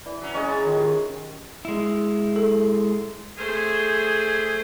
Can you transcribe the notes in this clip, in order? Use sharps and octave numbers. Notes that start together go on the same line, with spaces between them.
E3 D5
F#3 C#4
G#3 C#4 D#5 G#5
A#5 B5 A6
D#3 D#4 F4 D#5
G4 A#4
G#3 E4
A4
A3 G#4 C5